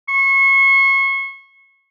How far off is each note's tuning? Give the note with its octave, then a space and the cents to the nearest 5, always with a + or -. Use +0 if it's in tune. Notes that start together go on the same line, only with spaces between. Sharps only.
C#6 -30